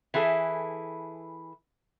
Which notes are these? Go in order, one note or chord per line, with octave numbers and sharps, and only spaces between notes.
E3 E4 G#4 A4